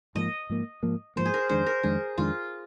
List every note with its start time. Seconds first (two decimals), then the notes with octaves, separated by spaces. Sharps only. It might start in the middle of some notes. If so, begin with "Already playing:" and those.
0.15 G#2 F3 A#3 D#5
0.50 G#2 F3 A#3
0.83 G#2 F3 A#3
1.16 G#2 F3 A#3 C5
1.25 G#4
1.34 A#4
1.49 F2 D#3 G#3 D4 C5
1.66 A#4
1.83 F2 D#3 G#3 D4 G#4
2.18 F2 D#3 G#3 D4 F4